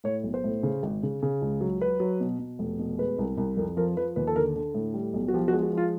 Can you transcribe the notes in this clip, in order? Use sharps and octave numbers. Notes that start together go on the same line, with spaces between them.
A2 C#5
B1
C5
A2
C#3
G#1
C#3
C#3
C#2
F#3
F#3 B4
F#3
B2
B2
F1
B2
G#3 B4
C2
C2
F2 A#4
F3 A#4
F3 B4
D#2 B4
A4
D3 A#4
D3
A2
G3
B1
F#4
F3 G4
F#4
G#3
F#4
F3 F4